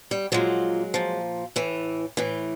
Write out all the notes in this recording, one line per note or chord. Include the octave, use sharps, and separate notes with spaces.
G3
A#2 F3 F#3 G#3
A#2 F3
A2 E3
A2 E3